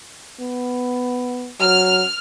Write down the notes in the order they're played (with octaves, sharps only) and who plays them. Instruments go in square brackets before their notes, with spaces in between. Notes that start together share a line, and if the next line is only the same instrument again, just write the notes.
[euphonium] B3
[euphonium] F#3 [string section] F6